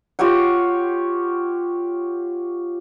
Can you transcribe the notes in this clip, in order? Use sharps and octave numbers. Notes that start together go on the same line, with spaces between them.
F4 G4 C#5 F#5